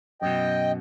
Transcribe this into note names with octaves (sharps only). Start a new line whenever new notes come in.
F#2 B2 D#5 G5